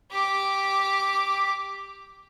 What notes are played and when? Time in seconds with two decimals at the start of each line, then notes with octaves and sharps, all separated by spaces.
0.11 G4 D6